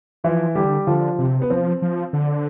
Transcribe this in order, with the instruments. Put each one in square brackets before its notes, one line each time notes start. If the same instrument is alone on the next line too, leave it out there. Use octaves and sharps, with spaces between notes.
[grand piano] E3 E4 [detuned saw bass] F3
[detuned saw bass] D3 [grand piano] G3 G4
[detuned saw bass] D3 [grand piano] F3 F4
[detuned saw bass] C3
[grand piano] B3
[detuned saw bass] F3 [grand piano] C4
[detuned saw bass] F3
D3